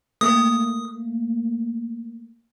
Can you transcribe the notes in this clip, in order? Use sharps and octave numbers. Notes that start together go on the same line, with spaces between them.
A3 A#3 D#6